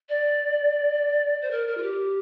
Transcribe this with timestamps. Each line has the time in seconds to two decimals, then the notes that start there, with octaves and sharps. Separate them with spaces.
0.09 D5
1.41 C5
1.50 A#4
1.67 A#4
1.77 F4
1.82 G4